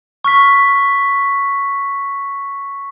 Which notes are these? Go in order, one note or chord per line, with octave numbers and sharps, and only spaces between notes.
C#6 F6 B6